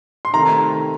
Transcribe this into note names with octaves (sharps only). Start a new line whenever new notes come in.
C6
C3 D#3 A3 A#5